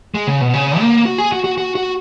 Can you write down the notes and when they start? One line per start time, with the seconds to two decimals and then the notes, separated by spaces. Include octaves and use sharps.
0.14 G#3
0.27 C#3
0.41 B2
0.54 C#3
0.80 A#3
1.05 F#4
1.18 G#4
1.32 F#4
1.44 F#4
1.58 F#4
1.75 F#4